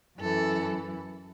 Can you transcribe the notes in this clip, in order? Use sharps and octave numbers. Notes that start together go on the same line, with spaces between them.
F#2 E3 A4